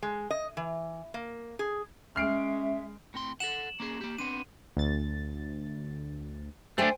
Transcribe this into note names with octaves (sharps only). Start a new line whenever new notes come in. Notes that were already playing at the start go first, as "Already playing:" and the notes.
G#3
D#5
E3
A#3
G#4
G#3 C#4 E5 F6 C7 D7
A2 C4 C6
A4 F#5 E7 F#7
A#3 C#4 G#4
A#3 G4
B3 C4 D4 D#7
D2 A6
A3 D4 C5 G5 G#5